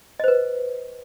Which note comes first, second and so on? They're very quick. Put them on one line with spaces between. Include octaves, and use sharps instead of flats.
D#5 C5 B4